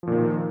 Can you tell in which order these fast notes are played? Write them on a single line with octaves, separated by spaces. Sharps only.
F3 A#2 D#3